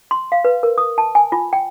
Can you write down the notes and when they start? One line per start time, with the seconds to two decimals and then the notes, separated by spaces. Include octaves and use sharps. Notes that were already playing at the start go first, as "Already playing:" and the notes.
0.11 C6
0.32 F5
0.45 B4
0.63 A#4
0.78 D#6
0.98 A5
1.15 G#5
1.32 F4
1.53 G5